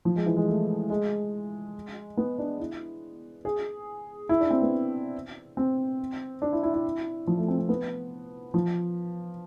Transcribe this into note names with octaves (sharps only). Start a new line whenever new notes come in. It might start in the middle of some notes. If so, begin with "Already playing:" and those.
F3
G#3
E3
G#3
A3
G#3
B3
D4
E4
G#4
E4
D4
C4
B3
C4
D4
E4
E4
E4
F3
A3
C4
C4
B3
F3